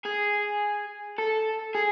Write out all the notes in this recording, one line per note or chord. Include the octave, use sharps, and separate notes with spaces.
G#4
A4
G#4